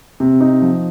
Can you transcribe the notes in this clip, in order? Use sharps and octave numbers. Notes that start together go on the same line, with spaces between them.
C3
D#4
F3